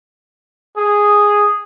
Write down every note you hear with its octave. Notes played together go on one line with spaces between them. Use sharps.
G#4